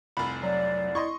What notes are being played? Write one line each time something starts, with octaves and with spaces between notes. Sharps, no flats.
F1 C2 B5
F#3 D5
E4 D#5 C6 C#6